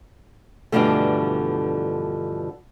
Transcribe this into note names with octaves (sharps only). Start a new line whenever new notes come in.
G2 B2 D3 E3 F3 A3